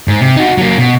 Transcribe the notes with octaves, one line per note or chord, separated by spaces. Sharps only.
G#2
C3
D#4 F#4
F#3 A#3
B2